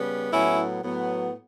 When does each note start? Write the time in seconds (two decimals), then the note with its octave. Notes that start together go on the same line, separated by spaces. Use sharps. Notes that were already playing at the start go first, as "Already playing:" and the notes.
Already playing: C#3 G3 B3
0.32 A2 F#3 B3 C#4 E4
0.83 A2 F#3 B3